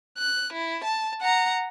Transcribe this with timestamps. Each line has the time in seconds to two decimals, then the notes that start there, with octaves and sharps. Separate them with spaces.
0.18 F#6
0.52 E4
0.84 A5
1.21 F#5 A#5